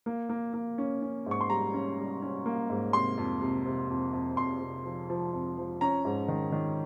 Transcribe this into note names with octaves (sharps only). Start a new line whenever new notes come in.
A#3
A#3
A#3
C#4
C#4
G#2
C#6
C6
G3 A#5
C#4
G3
C#4
A#3
G#2
C3 C6
F2
C3
C3
F2
F2
F2 C6
C3
F3
F3
F2
F3
C#4 A#5
G#2
D#3
D#3